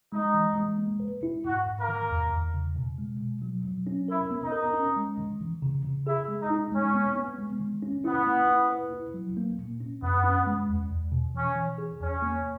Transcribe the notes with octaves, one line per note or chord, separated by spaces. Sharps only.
G#3 D#4
E3
G#3
A#3
B4
E4
G#2 F#4
G#2
A#3 A#4
D#3
E2
E2
C#3
B2
G#3
B2
F#3
F#3
C#4
E4 A#4
B3
D#4
A#4
C#4
G#3
D#3
E3
C#3
C#3
E4 G#4
G#3
D#4
D#4
G#3 C#4
B3
B3
G#3
D#3
C#4
B3 E4
A#3
E4
B4
E4
F#3
A#3
A#2
C#4
F#2 B3
C#4
G#3
E2
E2
B2
E3 C#4
E3
G#4
E2 C#4
A#3